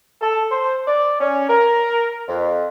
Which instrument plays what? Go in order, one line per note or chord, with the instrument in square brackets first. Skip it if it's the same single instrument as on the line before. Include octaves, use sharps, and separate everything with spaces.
[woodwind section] A4
C5
D5
C#4
A#4
F2